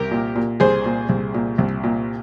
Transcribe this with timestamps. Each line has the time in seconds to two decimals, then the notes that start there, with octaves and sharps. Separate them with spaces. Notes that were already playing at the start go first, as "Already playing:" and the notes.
Already playing: C2 G4 A#4
0.11 A#2
0.35 A#2
0.60 C2 G#4 C5
0.85 A#2
1.09 C2
1.34 A#2
1.58 C2
1.84 A#2